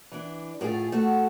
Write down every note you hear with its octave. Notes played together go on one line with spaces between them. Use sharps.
E3 D4
A2 A3 F4 G#4
A3 F#4 A4